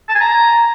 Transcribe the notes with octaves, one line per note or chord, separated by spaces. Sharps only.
A5
G#5
A#5